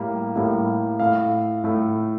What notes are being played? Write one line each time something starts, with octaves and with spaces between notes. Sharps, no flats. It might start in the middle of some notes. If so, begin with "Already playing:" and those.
Already playing: A2 G3 A#3
A2 G3 A#3
A2 A3 F5
A2 A3